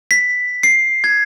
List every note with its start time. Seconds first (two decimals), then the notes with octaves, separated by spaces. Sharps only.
0.11 B6
0.63 C7
1.04 G#6